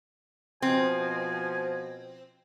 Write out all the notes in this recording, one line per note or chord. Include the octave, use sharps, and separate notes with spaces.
B2 F3 C4 G#5